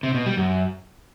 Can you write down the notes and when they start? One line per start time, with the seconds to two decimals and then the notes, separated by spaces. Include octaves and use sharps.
0.03 C3
0.15 B2
0.26 G3
0.37 F#2